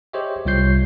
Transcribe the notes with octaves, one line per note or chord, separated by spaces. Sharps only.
G4 G#4 C5 C#5 D#5 E5
C2 G3 F4 C#5 G6 C7